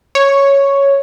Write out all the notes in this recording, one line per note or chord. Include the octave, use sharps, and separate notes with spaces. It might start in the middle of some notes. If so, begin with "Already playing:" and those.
C#5